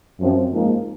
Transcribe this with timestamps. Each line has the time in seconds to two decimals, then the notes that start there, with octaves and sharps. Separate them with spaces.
0.20 F#2 F3 C4
0.52 G#2 F3 A#3